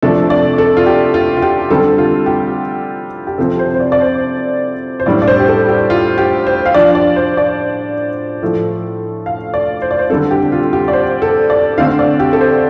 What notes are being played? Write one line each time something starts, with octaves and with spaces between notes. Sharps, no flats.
C3 F3 A3 D4 A4
D5
A4
F4
G4
F4
F4
G4
D3 G3 C4 A4
F4
G4
G4
C3 F3 C4 A4
C5
C5
D5
D5
C5
C5
A2 G3 D4 D5
D5
C5
G4
A4
G4
F4
G4
C5
F5
F3 D4 D5
D5
C5
D5
A2 F3 A3
F5
D5
C5
D5
C5
D3 G3 C4 A4
G4
F4
G4
D5
C5
A4
D5
D3 A3 C4 F5
D5
G4
A4
C5